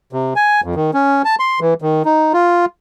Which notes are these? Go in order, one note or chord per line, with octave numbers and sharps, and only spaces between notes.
C3
G#5
F2
D#3
C#4
A5
C6
E3
D#3
D#4
F4